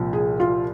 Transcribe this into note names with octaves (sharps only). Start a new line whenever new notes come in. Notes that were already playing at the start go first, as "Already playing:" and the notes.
Already playing: C2 A#2 F3
G#4
F4